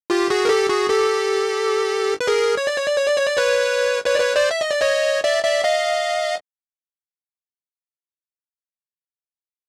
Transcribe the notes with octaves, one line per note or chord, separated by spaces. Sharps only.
F4 G4
F#4 G#4
A#4
G4 A4
F#4 G#4
G4 A4
B4
G#4 A#4
C#5
D5
C#5
D5
C#5
D5
C#5
D5
B4 C#5
B4 C#5
D5
B4 C#5
C5 D5
E5
D#5
D5
C#5 D#5
D5 E5
D5 E5
D#5 F5